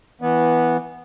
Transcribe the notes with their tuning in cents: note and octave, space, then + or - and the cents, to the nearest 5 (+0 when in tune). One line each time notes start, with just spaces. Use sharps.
E3 -10 B3 -10